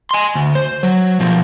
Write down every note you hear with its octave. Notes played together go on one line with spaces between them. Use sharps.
G#5 C6
D2
C5
F#3
B2 F3